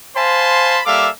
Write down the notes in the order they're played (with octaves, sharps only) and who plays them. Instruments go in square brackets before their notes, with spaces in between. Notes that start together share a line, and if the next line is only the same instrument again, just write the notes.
[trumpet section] C5 F5 G#5 A5 B5 C6
G3 A#3 A4 E5 F5 D6